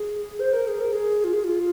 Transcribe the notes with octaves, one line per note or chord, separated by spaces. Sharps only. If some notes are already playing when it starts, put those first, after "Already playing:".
Already playing: G#4
C5
A#4
G#4
A#4
G#4
F4
G#4
F4